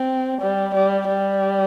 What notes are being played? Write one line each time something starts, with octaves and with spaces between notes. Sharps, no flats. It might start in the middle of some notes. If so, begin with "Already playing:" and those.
Already playing: C4
G3
G3
G3